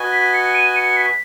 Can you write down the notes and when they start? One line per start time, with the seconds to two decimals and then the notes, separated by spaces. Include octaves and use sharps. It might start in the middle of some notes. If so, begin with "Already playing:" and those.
Already playing: F#4 B4 D#5 G#5
0.13 B6
0.34 C#7
0.55 D#7
0.76 C#7
0.97 B6